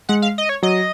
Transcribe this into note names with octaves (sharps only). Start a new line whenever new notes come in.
G#3 F#5
F5
D#5
C#5
F#3 D#5